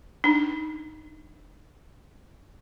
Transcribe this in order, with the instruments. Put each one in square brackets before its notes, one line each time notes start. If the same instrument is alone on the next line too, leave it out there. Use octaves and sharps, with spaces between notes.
[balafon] D4 D#4